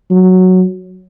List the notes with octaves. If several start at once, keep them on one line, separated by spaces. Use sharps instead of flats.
F#3